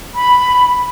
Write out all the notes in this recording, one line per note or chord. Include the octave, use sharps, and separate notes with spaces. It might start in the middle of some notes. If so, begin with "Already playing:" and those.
B5